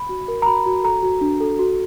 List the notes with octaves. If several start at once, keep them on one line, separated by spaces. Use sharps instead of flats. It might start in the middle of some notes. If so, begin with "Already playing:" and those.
Already playing: B5
F#4
A#4
A#5
F#4 B5
F#4
A4 A#5
F#4
D4
A4
F#4